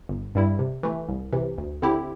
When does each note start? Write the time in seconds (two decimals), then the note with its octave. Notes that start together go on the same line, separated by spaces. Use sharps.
0.09 G1
0.35 G2 G3 E4
0.59 C3
0.83 E3 A3
1.08 C2
1.33 C3 E3
1.58 D2
1.82 D3 C4 E4 G4